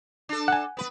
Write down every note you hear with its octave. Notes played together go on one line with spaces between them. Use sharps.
D4 A4
F#5 G#5
B3 B4